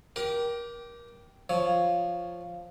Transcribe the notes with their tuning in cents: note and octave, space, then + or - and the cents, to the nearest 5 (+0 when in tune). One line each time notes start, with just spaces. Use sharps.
G4 -15 A#4 +25
F3 +0 C#5 +0